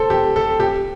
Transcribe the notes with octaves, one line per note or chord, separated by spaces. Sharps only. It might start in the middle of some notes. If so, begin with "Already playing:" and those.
Already playing: A4 C5
G4
A4
G4